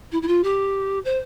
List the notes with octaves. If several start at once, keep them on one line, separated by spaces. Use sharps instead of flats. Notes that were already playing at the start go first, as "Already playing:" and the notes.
E4
E4
F4
G4
C5